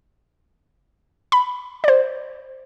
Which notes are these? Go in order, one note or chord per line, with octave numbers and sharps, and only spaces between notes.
B5
C5 D5